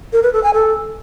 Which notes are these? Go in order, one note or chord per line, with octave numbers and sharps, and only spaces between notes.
A#4
B4
A4
G#5
A4